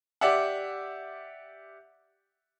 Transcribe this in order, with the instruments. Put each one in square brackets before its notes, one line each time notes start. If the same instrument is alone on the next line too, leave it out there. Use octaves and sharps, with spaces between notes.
[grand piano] G4 D5 E5 F#5